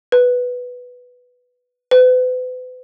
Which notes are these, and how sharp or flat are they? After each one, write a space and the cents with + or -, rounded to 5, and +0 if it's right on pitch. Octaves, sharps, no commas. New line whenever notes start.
B4 +0
B4 +40